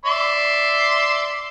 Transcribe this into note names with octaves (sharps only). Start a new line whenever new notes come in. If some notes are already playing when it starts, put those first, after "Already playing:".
D5 E5 C6